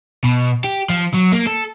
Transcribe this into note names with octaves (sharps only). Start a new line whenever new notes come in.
B2
G4
F3
F#3
A#3
A4